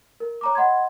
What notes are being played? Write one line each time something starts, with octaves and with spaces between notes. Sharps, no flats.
A#4
C#5 A#5 D6
D#5 F#5 B5 C6 G#6